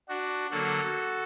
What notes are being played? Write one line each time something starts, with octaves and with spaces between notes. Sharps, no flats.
D4 F#4
D3 F#3 A#3 F#4 A4